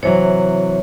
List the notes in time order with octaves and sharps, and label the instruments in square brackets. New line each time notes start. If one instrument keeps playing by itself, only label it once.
[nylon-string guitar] C3 E3 F#3 [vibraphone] C#5